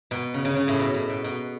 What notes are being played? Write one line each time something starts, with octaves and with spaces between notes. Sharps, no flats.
B2
C#3
C#3
C#3
A2
B2
A2
B2
B2